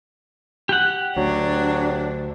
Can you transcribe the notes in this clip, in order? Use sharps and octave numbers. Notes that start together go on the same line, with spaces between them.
G4 F#5
D2 F#3 D4